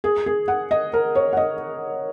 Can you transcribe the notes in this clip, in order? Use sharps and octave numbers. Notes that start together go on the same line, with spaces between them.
G#4
G#4
F#5
D#5
A#4
C#5
F#5
D#5